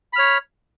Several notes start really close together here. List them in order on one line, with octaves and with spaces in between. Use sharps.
B5 F6 C#5